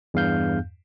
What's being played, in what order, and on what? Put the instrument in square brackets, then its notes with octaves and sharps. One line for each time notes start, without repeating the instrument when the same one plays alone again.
[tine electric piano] E2 G2 F5 G6